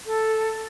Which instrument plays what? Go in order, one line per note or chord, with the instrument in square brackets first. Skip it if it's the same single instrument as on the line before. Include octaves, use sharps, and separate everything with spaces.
[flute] A4